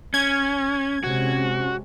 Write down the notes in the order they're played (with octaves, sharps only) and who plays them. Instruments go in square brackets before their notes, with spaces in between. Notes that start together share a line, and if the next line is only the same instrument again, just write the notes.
[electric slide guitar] C#4 [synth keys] G#6
[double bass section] C3 G#3 C#4 [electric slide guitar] F#4